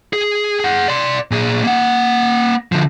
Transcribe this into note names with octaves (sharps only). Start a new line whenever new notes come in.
G#4
G#4 F#5
D5 C6
A#2 G#4
A#3 F#5
D3 F3